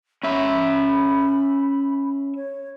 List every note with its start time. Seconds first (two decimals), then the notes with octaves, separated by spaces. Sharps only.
0.23 C#4 E5 B5
2.36 C#5